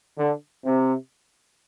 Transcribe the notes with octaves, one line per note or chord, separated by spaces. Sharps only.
D3
C3